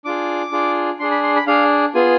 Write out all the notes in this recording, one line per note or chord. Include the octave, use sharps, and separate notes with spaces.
D4 F4 G#4 D6
D4 F4 G#4
D4 G#4 C6
B5
C6
B5
D4 G#4 F5
B3 F4 G#4 G#5